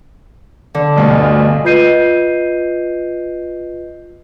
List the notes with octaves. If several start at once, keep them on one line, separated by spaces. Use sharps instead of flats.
D3
D2 G2 B2
F4 B4 D#5 G6 C7 D#7